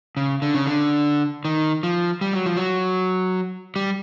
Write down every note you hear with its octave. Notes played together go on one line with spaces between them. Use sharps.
C#3
D3
C#3
D3
D#3
F3
G3
F#3
F3
F#3
G3